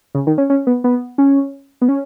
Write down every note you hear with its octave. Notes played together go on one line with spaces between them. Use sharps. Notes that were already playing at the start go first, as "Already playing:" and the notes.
C#3
D#3
C#4
C#4
B3
B3
C#4
B3
C#4